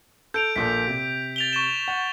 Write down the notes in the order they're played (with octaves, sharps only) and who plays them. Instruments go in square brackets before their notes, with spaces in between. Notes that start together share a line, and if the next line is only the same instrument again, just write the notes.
[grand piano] A4 [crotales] G6 D7 F7
[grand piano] A#1 A#2 A4 [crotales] B6
[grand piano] C3
[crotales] A6 F7 G7
C#6 A6 E7
[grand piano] F#5